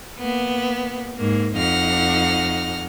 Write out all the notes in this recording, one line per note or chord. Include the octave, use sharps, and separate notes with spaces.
A#3 B3
G#2 A#3
F2 D#4 F#5 F6